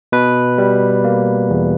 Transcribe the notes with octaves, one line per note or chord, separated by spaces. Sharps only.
B2 B4
G3
A#3
E2